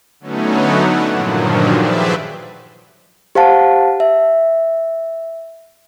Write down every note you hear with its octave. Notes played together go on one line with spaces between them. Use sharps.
D3 F#3 A3 B3 C#4 D#4
D4 E4 F#5
G2 A#2 D3 D#3 F3 F#3
G4 G#4 B4 C5 D5 E5
G4 C5 F5 F#5 A5
E5